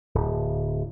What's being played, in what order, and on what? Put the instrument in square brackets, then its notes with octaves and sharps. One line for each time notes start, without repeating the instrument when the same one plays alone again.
[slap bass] D1